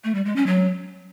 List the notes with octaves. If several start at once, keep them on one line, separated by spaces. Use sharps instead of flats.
A3
G3
G#3
C#4
F#3